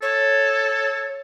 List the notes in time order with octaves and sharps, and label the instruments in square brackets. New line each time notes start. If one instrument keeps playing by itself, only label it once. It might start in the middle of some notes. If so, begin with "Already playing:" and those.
[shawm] A4 [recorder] C#5